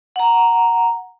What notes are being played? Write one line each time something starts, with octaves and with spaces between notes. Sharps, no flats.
F#5 A#5